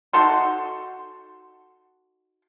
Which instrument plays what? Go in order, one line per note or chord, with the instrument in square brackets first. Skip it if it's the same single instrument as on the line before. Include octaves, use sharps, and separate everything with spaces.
[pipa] D#4 F#4 A4 C6